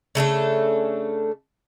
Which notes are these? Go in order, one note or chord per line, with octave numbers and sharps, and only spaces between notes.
C#3 A3 D4 A4